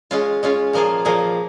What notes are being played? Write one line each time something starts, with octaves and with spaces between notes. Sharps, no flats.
G#3 C#4 F4
G#3 C#4 F4
A#2 F3 A#3 F4 G#4
A#2 F3 A#3 F4 G#4